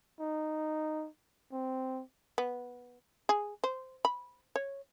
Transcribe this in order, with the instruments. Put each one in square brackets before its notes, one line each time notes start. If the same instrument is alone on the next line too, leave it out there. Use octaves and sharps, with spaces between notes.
[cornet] D#4
C4
[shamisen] B3
G#4
C5
B5
C#5